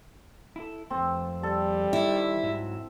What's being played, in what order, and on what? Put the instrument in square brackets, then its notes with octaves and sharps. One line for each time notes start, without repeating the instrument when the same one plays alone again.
[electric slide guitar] E4 A4
[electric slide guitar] F2 A3 [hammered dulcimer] C4
[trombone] G3 [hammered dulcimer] A4
[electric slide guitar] D#3 [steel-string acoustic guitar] E4
[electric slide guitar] G#2 F#3 E5